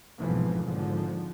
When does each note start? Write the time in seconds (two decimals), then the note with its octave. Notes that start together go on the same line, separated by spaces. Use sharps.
0.19 C2 F2 G#2 B2 E3 F3
0.63 G#1 G#2 D3 F3